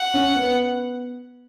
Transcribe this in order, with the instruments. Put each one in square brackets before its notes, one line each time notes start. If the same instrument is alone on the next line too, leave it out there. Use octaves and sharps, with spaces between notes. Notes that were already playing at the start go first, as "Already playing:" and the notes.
Already playing: [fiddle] F#5
[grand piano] C#4
B3